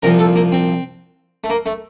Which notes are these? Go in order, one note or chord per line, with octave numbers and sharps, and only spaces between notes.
C2 A#2 F3 A#4
A4
A#3
C4
A3
A#3
A3